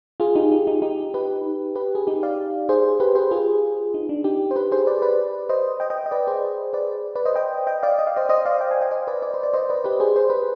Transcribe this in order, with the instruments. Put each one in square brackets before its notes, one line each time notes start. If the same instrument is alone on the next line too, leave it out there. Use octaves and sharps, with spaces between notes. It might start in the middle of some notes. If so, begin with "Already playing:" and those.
[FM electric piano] F4 G#4
D#4 G4
D#4
D#4
D#4 G4
G4 B4
G4 B4
G#4
D#4 G4
D5 F5
G#4 C5
G4 B4
G#4 C5
F4 G#4
D#4
D4
D#4 G4
C5
G4 B4
G#4 C5
B4 D5
B4 D5
C5 D#5
D#5 G5
D#5 G5
D#5
B4 D5
G#4 C5
B4 D5
B4 D5
C5 D#5
D#5 G5
D#5 G5
D5 F5
D#5
F5
C5 D#5
C5 D#5
D5 F5
D#5 G5
F5 G#5
D#5 G5
C5 D#5
B4 D5
B4 D5
C5
D5
C5 D#5
B4 D5
G4 B4
G#4 C5
C5
B4